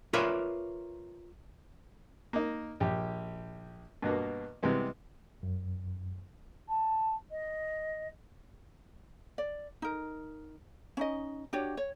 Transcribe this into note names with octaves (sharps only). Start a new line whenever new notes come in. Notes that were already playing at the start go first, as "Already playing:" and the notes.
F4 A#4 B4 C#5 D5 E5
A#3 D#4
A#1 G4
G2 B2 A#3 B3
C3 E3 G3 G#3 B3
F#2
A5
D#5
D5
D#4 A#4
C#4 D#4 D#5
D4 F#4 G4 C#5
C#5